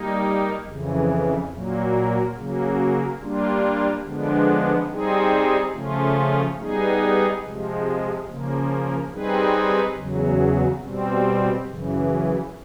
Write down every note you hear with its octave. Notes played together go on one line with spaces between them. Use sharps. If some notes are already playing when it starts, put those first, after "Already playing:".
Already playing: G3 A#3 D#4
F2 C#3 E3
A#2 F#3 A#3
C#3 F#3 A#3
G3 A#3 D4 F4
D3 F3 G#3 B3 D4
G3 C4 D#4 G#4
C#3 F3 A3 C#4 F4
G3 B3 D#4 G#4
C3 F3 G#3
C#3 F3 A#3
G3 C4 D#4 G#4 B4
E2 C#3 F#3
B2 G3 C4
F#2 C#3 E3